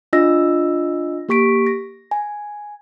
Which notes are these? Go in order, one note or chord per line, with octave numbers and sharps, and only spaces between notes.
D4 F4 D#5 E6 A#6
A#3 G4 C#6 B6 D7
A#6
G#5